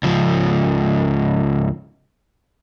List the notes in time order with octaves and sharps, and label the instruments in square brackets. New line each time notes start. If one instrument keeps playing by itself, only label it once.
[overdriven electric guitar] C#2 F3